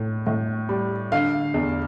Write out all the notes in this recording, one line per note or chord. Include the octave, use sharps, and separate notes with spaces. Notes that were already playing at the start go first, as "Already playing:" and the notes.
Already playing: A2
A2
G3
D3 F5
E2